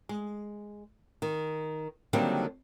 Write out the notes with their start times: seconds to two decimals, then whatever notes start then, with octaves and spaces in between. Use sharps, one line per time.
0.09 G#3
1.22 D#3
2.13 D3 D#3 F#3 G3 A#3 C4